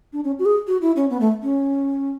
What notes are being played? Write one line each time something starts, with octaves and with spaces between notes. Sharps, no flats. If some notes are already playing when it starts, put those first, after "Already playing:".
D4
C#4
F#4
G#4
F#4
E4
C#4
B3
A3
C#4